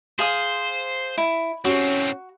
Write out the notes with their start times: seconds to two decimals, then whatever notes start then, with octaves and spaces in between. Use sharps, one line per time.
0.19 G#4 C5 F5 D#6
1.18 E4
1.65 A2 C4 C#4 F#4